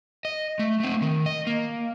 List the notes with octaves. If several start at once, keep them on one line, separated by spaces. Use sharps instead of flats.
D#5
A3
A3 C4
D#3
D#5
A#3